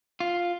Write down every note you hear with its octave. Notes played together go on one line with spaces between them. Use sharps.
F4